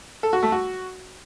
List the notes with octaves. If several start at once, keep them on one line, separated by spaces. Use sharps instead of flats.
A4
F#4
A3
F#4